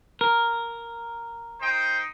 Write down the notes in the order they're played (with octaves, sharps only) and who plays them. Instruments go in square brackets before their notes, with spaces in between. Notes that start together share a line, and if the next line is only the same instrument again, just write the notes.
[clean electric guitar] A#4
[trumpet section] D#4 C5 G5